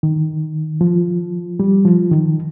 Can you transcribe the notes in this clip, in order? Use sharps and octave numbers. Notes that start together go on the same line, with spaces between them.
D#3
F3
G3
F3
D#3